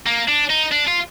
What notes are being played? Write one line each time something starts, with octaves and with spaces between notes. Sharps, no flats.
A#3
D4
D#4
D4
F4